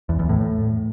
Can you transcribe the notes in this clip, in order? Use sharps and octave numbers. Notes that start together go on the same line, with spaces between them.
E2
E2
A2